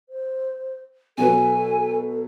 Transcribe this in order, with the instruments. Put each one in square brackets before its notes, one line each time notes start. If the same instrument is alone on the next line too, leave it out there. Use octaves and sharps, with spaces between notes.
[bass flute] C5
[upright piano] B2 F#3 B4 [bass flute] A4 [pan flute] G#5